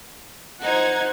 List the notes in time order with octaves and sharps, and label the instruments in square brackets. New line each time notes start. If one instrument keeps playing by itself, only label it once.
[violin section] D#4 G#6 [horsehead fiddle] C5 F#5